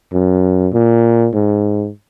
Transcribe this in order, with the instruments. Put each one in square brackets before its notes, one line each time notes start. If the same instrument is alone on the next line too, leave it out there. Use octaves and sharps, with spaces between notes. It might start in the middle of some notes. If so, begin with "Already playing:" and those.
[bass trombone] F#2
A#2
G#2